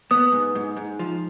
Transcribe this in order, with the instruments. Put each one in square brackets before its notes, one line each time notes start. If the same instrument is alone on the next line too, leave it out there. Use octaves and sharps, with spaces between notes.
[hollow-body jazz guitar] B3 [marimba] D#6
[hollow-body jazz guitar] G#2
G#2
G#2
F3